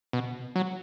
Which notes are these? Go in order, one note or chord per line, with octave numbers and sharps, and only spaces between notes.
B2
F#3